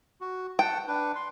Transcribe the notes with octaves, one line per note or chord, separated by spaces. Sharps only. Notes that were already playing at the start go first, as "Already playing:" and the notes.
F#4
F#5 G5 A5
D4 B4
C6